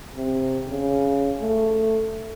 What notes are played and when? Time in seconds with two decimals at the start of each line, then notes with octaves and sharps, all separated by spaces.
0.15 C3
0.67 C#3
1.41 A3